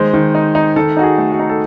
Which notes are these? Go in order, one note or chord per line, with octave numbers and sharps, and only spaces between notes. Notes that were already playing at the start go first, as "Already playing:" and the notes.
Already playing: D#3 G#3 C5
D#3
D#4
D#4
D#3 A4
D#4 F#4
G#4
A3
F#4
D#4
A4